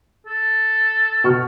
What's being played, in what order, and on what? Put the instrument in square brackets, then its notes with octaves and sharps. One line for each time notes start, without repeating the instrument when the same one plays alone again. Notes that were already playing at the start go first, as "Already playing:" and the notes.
[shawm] A4
[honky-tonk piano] B2 C#6 F6